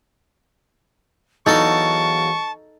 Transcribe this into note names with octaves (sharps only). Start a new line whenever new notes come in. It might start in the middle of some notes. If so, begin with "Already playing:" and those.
E2 F#3 D#4 A4 F5 A5 C#6